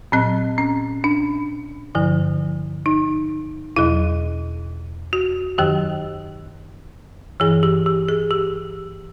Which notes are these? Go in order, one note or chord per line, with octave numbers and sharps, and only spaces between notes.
A#2 F#3 C4
C#4
D4
G2 D3 F3
D#4
E2 B2 F#3 E4
F#4
F#2 D#3 F#3 G4
G2 E3 G#4
G4
G4
G#4
G4